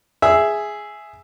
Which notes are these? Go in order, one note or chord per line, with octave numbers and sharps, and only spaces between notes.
G#4 E5